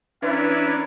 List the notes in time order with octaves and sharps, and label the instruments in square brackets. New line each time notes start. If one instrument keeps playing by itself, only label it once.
[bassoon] E3 [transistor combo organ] C#4 D4 [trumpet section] A#4 B4 E5